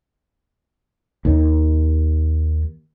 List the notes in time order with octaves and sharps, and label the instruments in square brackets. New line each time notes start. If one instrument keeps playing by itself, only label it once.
[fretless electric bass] D#2 D#3